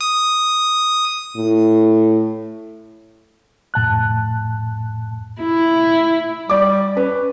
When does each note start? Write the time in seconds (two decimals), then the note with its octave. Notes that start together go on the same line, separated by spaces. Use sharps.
0.01 D#6
1.36 A2
3.74 F2 A2 A5 F#6
5.41 E4
6.50 G3 D5 D6
6.97 C#4 B4